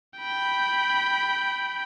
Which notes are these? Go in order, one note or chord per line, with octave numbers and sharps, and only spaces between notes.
G5 B5